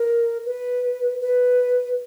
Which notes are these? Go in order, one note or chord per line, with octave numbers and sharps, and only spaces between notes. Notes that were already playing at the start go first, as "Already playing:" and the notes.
Already playing: A#4
B4
B4